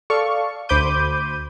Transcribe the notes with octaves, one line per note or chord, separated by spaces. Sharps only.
A4 D5 F5 C#6
D2 C5 B5 D6 G6 D#7